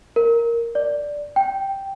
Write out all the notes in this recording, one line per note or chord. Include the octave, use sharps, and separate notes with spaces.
A#4
D5
G5